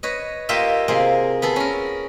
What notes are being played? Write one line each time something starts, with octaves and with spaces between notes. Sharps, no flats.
B4 C#5 D#5
A#3 F4 G4 D#5 E5
C3 A#3 F4 G#4
B3 G#4 A4
C#4 A#4